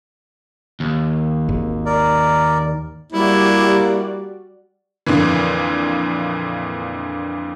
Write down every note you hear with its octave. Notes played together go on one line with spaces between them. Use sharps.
D#2
G#1
A#4 D5
G3 A#3 E4 F#4 D5
F2 A#2 D3 E3